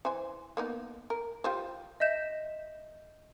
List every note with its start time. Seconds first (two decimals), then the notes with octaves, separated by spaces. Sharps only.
0.05 E3 C5 G#5
0.57 A#3 B3 D#4
1.10 A#4
1.44 F4 G4 C5
2.00 D#5 E5 G6 E7